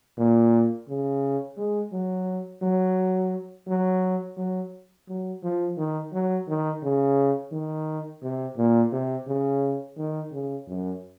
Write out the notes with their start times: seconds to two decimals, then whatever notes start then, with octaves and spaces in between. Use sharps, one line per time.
0.17 A#2
0.88 C#3
1.57 G#3
1.92 F#3
2.62 F#3
3.67 F#3
4.37 F#3
5.08 F#3
5.43 F3
5.77 D#3
6.13 F#3
6.48 D#3
6.83 C#3
7.52 D#3
8.22 C3
8.57 A#2
8.92 C3
9.27 C#3
9.97 D#3
10.32 C#3
10.67 F#2